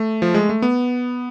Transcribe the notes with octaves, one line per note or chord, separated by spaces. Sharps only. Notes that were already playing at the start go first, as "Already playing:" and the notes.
Already playing: A3
F3
G#3
A3
B3